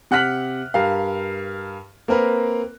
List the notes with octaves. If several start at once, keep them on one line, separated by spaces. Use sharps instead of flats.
C3 F#5 F6 F#6 B6 F#7
G2 A#4 F5
A#3 C4 A#4 B4